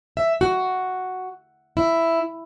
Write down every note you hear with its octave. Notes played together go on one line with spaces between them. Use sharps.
E5
F#4
E4